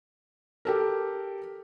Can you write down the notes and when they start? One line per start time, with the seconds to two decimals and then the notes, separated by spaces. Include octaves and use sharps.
0.65 G4 A4 A#4